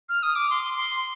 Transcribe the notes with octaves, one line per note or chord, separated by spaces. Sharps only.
F6
D#6
D6
C6
C6